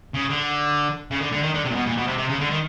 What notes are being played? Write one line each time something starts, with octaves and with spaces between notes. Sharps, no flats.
C#3
D3
C#3
D3
D3
D#3
D3
C3
A#2
B2
A#2
B2
C3
C3
C#3
D3
D#3